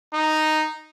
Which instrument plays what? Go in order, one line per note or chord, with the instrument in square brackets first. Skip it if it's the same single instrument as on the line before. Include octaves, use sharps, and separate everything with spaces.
[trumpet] D#4